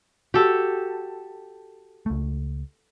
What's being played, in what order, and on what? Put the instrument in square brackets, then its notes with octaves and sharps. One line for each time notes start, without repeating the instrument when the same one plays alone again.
[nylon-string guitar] F#4 [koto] G4 A4
[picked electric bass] C#2 A3